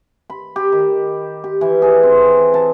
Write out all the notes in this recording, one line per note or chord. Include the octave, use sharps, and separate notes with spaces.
B5
G4
D#3
G4
E3
G#4
C4
A5